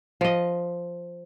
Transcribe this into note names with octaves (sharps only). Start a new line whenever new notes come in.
F3 D#5